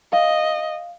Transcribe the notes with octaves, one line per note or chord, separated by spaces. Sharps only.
D#5 F5